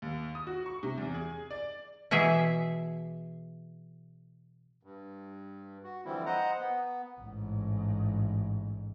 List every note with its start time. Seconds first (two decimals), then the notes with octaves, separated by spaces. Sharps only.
0.02 D#2
0.35 D#6
0.47 F#4
0.66 C#6
0.83 C3
0.97 E2
1.14 G#4
1.51 D5
2.11 B2 E3 G#4 E5
4.83 G2
5.83 F#4
6.05 D3 E3 F3 G3 C4 E4
6.26 C5 D#5 F#5 A#5
6.59 B3
7.21 A1 G#2